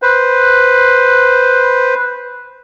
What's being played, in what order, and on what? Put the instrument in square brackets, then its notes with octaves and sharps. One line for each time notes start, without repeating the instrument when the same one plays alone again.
[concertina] B4 C5